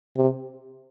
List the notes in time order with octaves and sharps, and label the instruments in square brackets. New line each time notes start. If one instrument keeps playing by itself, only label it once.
[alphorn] C3